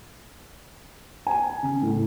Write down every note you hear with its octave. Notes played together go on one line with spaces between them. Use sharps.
G#5
C#3
A2